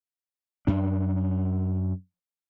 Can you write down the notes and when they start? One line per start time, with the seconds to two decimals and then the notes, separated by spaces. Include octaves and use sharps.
0.67 F#2 D4